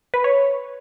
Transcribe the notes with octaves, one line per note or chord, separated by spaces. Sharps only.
B4
C#5